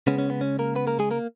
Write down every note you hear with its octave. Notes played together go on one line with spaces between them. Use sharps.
C#3 G#3 B3 C#4
C#4
B3
C#4
A#3 A#4
B3 B4
A#3 A#4
G#3 G#4
A#3 A#4